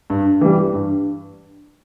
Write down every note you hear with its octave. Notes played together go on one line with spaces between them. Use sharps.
G2
E3 G3
G2